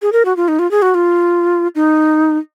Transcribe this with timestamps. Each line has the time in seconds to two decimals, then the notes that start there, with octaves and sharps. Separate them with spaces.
0.02 G#4
0.12 A#4
0.25 F#4
0.37 F4
0.48 D#4
0.59 F4
0.71 G#4
0.82 F#4
0.95 F4
1.75 D#4